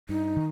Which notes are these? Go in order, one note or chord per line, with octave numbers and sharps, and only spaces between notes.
G2 D#4
D#3